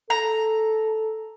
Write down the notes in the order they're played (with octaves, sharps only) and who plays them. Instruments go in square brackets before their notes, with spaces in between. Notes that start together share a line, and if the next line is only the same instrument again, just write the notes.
[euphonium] A4 [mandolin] A#5